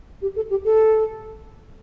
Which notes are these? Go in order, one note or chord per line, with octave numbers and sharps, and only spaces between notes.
G4
A4
G4
A4